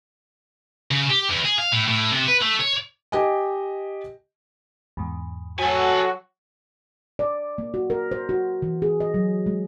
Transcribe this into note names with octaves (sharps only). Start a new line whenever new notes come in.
C#3
G4
E2
G#4
F5
A2
A2
C3
B4
A3
C#5
G4 D#5 G#5
E2 G#2
F#3 F#4 A4 G#5
D5
A#3
F#4
A#4
C5
F#4
E3
G#4
D#5
F#3
G#3